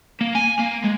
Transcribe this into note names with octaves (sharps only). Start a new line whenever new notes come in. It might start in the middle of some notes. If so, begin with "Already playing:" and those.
A#3
G#5
A#3
G#3